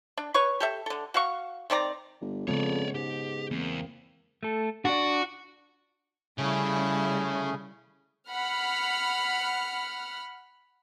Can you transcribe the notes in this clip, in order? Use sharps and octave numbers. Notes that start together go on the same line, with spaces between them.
D4
B4 C#5 C#6
G4 A4 E5
D3 A4
F#4 F5 C#6
D#3 C4 D5 A#5
G1
F2 C#3 G#3 B3 C#5 D5
G#2 G4
E2 A#3 C4
A3 A4
D4 F#4 D5
C#3 G3 A3 C#4 E4 G#4
F#5 B5 F6